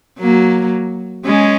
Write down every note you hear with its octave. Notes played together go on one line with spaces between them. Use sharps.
F#3 A#3
G#3 C#4